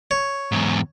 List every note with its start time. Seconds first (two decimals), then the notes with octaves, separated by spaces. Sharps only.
0.11 C#5
0.52 E2 G#2